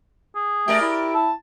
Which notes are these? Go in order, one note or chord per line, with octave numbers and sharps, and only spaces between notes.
G#4
A3 G4 A#4 D5
E4
A5